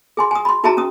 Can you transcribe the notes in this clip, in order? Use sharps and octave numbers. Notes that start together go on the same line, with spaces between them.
G#4 G#5 C6
G#5 D#6
B5 C6
D#4 F#4 G#4 E5 A5 A#5
C#4 D#6